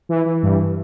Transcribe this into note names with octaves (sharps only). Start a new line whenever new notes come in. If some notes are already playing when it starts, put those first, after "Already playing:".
E3
E3
G2